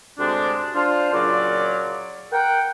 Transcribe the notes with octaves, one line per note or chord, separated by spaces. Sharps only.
D2 C3 G#3 C4 D4
D4 F4 C5
A#2 C#3 F#3 F4 D5
A#4 F#5 G5